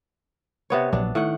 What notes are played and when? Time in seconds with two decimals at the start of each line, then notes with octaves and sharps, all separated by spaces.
0.70 C3 B3 C#5
0.93 A#1 F#3 B3 D4
1.15 A2 D#3 F#5